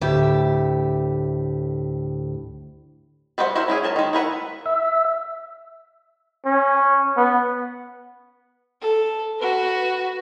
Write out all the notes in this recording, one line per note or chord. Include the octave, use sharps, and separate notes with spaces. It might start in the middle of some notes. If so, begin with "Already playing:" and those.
D2 A2 G4 E5
G3 B4 C5 D5 F#5
E4 F#4 A#4 C5 E5
C#4 E4 G#4
F#3 A#4 A5
D#3 G#3
E4 A#4 B4 F#5
E5
C#4
B3
A4
F#4 B4